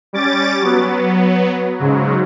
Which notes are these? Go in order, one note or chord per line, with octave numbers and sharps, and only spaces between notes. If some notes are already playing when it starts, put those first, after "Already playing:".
G3 C#4 D6 A6
F#3 B3
G#2 C#3 F#3